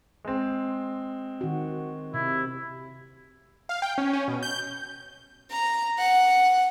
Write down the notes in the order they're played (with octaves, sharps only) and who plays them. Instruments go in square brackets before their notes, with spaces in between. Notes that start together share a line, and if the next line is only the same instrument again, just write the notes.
[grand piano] G#3 C4
[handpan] D#3 F#4
[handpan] C3 [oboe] E4
[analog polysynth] F5
G5
C#4
C#4
B2
G6
[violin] A#5
F#5